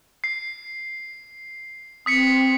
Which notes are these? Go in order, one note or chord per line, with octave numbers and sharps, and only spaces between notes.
C7
C4 D#6 B6 C#7